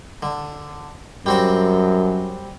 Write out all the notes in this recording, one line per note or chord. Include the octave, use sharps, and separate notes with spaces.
D3
F#2 G3 C4 F#4